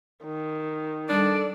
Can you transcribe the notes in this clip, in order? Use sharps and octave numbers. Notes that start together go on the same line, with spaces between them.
D#3
G3 D4 A4 D5